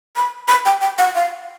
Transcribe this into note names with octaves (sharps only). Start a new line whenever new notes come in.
B5
B5
G5
G5
F#5
F5